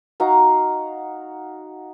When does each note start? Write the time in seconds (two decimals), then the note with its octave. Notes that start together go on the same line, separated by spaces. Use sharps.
0.20 D#4 F#4 F5 A#5